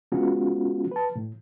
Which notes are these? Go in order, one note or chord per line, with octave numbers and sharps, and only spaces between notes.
G#3 B3 C#4 F4 F#4
B4 A5
A2